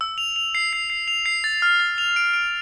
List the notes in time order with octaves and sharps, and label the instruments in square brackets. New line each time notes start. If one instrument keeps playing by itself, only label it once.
[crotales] E6
F7
F7
C7
C7
C7
F7
C7
A6
F6
A6
F7
D7
D7